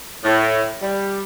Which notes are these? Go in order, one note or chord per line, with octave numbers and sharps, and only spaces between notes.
A2
G3